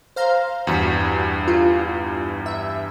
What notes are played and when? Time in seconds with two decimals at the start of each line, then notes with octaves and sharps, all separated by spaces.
0.16 C5 F5 A#5
0.67 E2 G2 F#4 B6
1.48 F4
2.46 E5